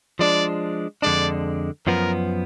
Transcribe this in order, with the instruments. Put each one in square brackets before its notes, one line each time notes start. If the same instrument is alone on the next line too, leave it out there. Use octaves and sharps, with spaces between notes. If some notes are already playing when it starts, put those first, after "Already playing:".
[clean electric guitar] F3 G#3 D4 [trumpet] D5
[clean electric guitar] F2 D3 G#3 D4 [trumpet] D5
[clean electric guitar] F#2 F3 B3 [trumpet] A#4